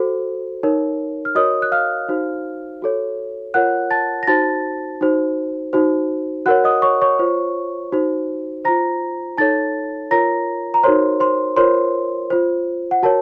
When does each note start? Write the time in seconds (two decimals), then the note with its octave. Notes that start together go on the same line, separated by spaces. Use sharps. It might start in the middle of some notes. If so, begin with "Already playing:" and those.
Already playing: F#4 A4 C5
0.63 D#4 A#4 C#5
1.25 F6
1.35 F#4 A#4 C#5 D#5 D#6
1.62 F#6
1.72 F5 F6
2.09 D#4 F#4 C5
2.82 F#4 A4 C#5
3.54 F4 A#4 C#5 F#5 F#6
3.91 A5 A6
4.23 A#6
4.27 D#4 F#4 C5 A5 A6
5.01 D#4 F#4 C5
5.73 D#4 F#4 C5
6.46 F#4 A#4 C#5 F#5 F#6
6.64 D#5 D#6
6.82 C#5 C#6
7.01 C#5 C#6
7.19 F4 C5
7.92 D#4 F#4 C5
8.65 F4 C5 A#5 A#6
9.38 D#4 A4 C#5 A5 A6
10.11 F4 A#4 C#5 A#5 A#6
10.74 A#5
10.83 D#4 F#4 A#4 C5 C#5 C6
11.20 C5 C6
11.56 F4 A#4 C5 C#5 C6
12.30 F4 C5
12.91 F#5
13.03 F#4 A#4 C#5 A5